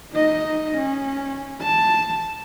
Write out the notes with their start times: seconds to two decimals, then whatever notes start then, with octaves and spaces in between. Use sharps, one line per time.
0.13 D#4 D#5
0.77 C#4
1.62 A5